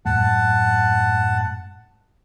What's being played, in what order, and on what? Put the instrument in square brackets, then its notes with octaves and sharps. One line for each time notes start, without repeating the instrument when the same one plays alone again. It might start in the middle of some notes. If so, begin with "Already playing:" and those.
[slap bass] F#2 A2 G#3 [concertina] F#5 A5